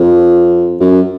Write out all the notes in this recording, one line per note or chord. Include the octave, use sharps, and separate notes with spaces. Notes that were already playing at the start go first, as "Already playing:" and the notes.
Already playing: F2
F#2